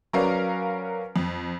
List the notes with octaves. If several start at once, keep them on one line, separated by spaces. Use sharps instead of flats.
F#3 C#4 A#4 B4 D5 F5
F2